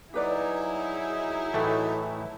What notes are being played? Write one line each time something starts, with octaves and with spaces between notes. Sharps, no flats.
F#3 D#4 E4 G4 G#4 B4 D5
A2 E3 A3